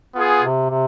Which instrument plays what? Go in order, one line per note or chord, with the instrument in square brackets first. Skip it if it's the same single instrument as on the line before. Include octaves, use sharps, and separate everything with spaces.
[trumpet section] B3 F4 G#4
[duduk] C3
C3